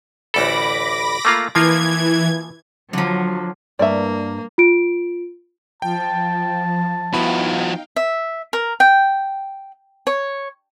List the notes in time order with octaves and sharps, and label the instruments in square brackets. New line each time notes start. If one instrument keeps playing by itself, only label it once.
[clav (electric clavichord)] A1 D2 A4 [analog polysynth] B5 D6 A#6
[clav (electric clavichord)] A3 A#3 F4
[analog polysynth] E3 G#6 [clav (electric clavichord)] F3 A#3 F4
[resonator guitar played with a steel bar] D3 F3 [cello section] F#3
[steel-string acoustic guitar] G2 [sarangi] A#3 [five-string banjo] D5 E5
[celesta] F4 D7
[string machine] F3 [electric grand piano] G5 [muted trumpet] A5
[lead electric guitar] F3 F#4 [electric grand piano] B3 E4 B5 [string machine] D#4 F5 G5
[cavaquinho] E5
A#4
G5
C#5